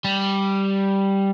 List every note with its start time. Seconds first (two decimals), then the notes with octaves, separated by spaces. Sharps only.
0.05 G3